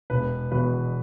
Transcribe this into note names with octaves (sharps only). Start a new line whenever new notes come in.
E1 B4
E2 B2 B4